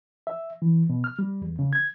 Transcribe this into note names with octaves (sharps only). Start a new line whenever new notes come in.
E5
E3
B2
F6
G3
E2
C#3
G#6